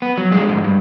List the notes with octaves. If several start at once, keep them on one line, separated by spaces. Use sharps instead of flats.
B3
F#3
F2 G#3
D2 G#2
G2